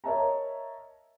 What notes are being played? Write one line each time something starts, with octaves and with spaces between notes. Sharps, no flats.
A#4 C#5 D#5 E5 A5 A#5